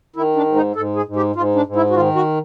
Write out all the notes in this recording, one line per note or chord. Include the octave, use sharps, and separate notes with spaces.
D#3 E4
D4
G#2
D#4
G#2 A4
G#4
G#2
G4
G#2 F4
D4
G#2
E4
F#4
D#3 F4
F#4